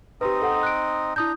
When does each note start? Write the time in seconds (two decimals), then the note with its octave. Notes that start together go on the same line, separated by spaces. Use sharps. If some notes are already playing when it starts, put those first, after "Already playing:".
0.21 C4 D#4 G4 B4 D#5
0.42 A4 F#5
0.63 F#6 D7
1.16 D4 E4 A#5 D#6 G6